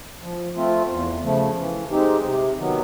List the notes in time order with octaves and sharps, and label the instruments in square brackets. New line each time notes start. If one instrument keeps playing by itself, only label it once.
[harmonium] F3
A3 C4 F4
E2
C#3 F3 A3
E3
G#3 C4 D#4 G4
C3
D#3 F#3 B3